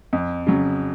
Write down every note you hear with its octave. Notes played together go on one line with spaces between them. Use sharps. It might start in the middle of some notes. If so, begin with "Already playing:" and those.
F2
C#3 F#3